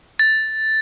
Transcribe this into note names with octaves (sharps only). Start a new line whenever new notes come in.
A6